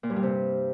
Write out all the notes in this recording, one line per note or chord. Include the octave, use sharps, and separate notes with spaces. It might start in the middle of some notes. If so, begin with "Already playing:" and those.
A#2
G2
G3
C3